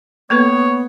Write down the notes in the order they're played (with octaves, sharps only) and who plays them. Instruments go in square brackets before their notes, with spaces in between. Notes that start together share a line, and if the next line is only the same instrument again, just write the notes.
[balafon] A#3 A4 B4 [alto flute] B3 [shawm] C#5